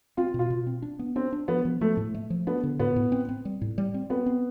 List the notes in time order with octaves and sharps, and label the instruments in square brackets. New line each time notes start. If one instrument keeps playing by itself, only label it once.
[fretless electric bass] C4 [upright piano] F4
[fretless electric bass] B2
[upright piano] F4
[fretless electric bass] B2
C4
D4
B3
[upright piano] C4 [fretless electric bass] D4
[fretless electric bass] D4
[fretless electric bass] F3 [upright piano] B3
[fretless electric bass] F3
[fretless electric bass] F3 [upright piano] A3
[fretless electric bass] A2
A3
F3
[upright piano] B3 [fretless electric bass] D4
[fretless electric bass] D3
[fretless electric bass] A2 [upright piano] B3
[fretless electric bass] A2
C4
C4
G3
A2
G3
C4
[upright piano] B3 [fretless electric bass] C4
[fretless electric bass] C4